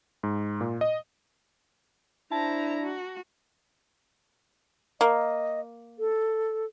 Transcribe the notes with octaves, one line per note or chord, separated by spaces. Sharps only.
G#2
A#2
D#5
D4 E4 C5 A5 A#5
F#4
A#3 D#5
A4